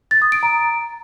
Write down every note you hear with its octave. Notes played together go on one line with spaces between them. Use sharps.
A6
D#6
D7
A#5